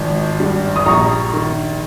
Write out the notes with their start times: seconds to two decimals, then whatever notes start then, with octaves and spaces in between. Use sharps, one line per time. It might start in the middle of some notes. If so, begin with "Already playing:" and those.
Already playing: G#1 F3
0.40 G2
0.76 D#6
0.86 A#1 A#5 C#6
1.33 D#3